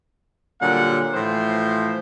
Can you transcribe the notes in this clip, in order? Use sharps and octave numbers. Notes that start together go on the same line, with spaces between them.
A#2 D3 F#3 G3 F#5
A2 E3 F3 C5